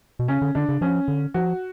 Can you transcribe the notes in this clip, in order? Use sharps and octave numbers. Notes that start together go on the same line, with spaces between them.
B2
C#3 C#4
D3
D3 D4
C#3
F3 C#4
D3
F3 F#4